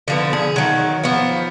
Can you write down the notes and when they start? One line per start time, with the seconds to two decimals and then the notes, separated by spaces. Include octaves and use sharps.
0.08 D3 F3 B3
0.33 G#4
0.56 D#3 F#3
1.04 F3 B3